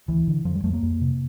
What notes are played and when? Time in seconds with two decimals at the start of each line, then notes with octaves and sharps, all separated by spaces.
0.08 D2 E3
0.27 D3
0.45 F2 F3
0.55 G3
0.63 F2 A3
0.73 A#3
0.83 F2
1.01 C3